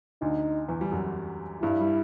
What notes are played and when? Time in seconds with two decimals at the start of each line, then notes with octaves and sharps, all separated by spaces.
0.22 D2 D3 D#4
0.69 E2 E3
0.81 G3
0.92 F#2 F#3
1.62 G2 G3 E4
1.80 G3